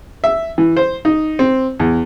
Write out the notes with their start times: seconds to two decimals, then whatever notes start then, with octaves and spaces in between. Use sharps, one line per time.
0.24 E5
0.58 E3
0.77 C5
1.05 D#4
1.39 C4
1.80 E2